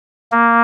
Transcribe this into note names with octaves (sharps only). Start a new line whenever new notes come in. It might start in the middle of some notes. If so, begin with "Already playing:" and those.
A#3